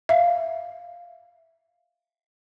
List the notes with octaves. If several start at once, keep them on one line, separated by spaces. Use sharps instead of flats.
E5 F5